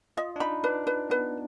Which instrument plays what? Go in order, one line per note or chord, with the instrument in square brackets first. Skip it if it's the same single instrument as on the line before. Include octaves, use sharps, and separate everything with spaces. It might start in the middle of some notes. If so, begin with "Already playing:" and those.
[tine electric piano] F4 [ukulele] D#5
[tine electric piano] D4
[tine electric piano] D#4 [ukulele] B5
[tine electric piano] D4 [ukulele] B4
[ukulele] B4
[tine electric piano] B3 [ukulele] B4